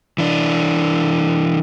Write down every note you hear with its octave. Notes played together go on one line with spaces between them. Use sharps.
E3 D4